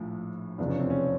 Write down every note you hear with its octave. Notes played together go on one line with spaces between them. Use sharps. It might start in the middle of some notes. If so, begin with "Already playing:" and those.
Already playing: A#1 A2 F3
F1 E2 C#3 F3 D4
C#4
C4
C#4